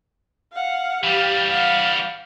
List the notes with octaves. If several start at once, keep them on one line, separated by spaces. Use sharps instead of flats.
F5 F#5
E3 G3 G4 F5
F5 F#5